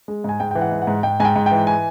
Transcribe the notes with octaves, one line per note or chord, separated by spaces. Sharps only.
G#3
G#2 G#5
G#2 G5
E3 G5
F#5
G#2
F#5
G#2
G#2 G5
G#2 G#5
G5
G#2
G5
E3
G#5